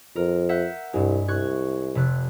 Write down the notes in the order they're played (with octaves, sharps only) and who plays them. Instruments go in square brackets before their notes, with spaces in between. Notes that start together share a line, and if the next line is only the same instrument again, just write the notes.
[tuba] F2 [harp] A#4
[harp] E5 F#5 G6
[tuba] C2 [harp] G2 G#3
[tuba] C2 [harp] C#6 F#6 G#6
[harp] F1 C3 F#6